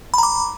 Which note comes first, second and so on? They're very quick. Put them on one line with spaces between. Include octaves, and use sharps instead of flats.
B5 A#5 D6